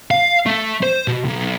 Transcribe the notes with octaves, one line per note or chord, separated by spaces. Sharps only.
F5
A3
C5
B2
B1